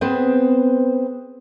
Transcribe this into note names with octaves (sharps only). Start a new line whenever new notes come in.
B3 C4 G#4 B4 C5